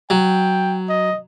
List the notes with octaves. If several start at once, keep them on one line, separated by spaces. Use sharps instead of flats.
F#3 G5
D#5